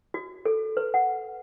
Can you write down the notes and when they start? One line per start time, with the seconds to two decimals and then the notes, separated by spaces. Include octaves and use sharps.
0.14 F#4
0.45 A4
0.77 B4
0.94 F#5